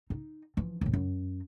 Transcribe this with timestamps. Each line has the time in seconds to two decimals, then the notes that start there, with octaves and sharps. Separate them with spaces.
0.10 D#4
0.57 E3 F3
0.81 D#2 A2
0.93 F#2